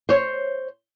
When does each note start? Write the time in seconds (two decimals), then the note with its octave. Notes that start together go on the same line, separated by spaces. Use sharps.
0.09 C5 C#5